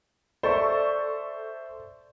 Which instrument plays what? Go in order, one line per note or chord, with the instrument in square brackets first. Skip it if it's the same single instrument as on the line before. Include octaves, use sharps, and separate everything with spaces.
[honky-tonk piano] A4 D5 C#6 [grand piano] C5 E5